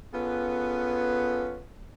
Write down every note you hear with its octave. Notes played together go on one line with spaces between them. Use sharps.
B3 C#4 F4 G#4 A4 B4